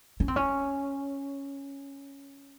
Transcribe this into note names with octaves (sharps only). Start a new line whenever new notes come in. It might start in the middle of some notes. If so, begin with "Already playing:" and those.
C#4
C4
C#4